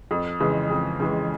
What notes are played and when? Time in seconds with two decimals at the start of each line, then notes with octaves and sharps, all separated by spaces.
0.11 F2
0.40 C#3 E3 G#3
0.71 F2
1.00 C#3 E3 G#3